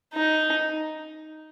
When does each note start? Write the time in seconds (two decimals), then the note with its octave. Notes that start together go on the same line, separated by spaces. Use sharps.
0.14 D#4